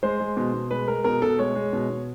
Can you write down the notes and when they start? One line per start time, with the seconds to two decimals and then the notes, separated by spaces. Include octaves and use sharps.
0.03 G#3 C5
0.20 G#3
0.37 B2
0.54 B2
0.71 G#3 B4
0.88 G#3 A#4
1.04 B2 A#4
1.22 B2 A4
1.39 G#3 C#5
1.55 G#3
1.73 B2
1.90 B2